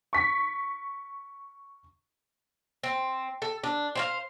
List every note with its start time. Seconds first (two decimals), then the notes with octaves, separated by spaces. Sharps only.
0.13 C#6 B6
2.83 C4
3.42 A4
3.64 D4
3.95 C5 C#5 F5